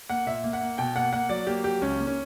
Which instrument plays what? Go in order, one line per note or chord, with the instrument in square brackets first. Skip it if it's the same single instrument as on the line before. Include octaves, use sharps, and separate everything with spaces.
[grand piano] A#3 F#5
A#2 E5
A#3
F#5
A#3
B2 G5
A#3 F#5
A#3 F#5
F#3 D5
A#3 G4
F#3 G4
C#2 C#4
A#3
C#4